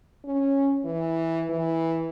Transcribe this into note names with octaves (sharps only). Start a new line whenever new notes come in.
C#4
E3
E3